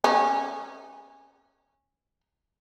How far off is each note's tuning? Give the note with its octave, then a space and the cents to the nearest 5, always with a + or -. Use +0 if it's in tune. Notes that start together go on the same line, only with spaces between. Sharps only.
C#4 -15